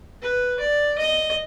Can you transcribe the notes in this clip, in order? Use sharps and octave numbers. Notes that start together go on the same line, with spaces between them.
B4
D5
D#5